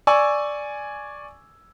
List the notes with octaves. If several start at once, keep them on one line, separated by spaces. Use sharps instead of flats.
D5 G#5 C#6 E6